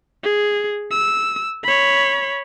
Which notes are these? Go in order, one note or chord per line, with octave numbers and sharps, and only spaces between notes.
G#4
E6
C#5 B5